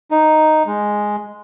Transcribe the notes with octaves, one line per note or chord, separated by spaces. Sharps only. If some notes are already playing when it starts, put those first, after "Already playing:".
D#4
G#3